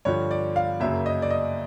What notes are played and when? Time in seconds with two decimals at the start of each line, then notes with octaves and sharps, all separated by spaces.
0.05 G2 D3 F3 C#5
0.31 D5
0.56 F5
0.80 F#2 C#3 F#3 A#3 E5
1.06 D#5
1.22 D5
1.30 D#5